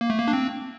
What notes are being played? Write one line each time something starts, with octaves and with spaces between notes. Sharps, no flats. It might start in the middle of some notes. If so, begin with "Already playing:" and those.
A#3
A3
A#3
D4
C4